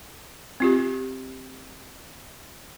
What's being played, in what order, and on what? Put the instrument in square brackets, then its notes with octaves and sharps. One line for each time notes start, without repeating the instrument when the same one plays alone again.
[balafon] C4 F4 G4